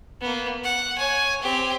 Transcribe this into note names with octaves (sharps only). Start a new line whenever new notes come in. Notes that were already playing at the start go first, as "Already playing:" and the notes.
A#3 B3
F#5
C#5 G#5
C4 G4